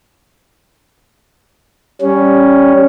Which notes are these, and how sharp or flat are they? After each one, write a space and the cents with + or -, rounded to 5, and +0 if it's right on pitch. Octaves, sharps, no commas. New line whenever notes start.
G3 -5 C#4 +0